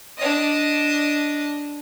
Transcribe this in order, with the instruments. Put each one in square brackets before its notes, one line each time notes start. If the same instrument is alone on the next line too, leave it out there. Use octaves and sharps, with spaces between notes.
[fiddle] D4 D#5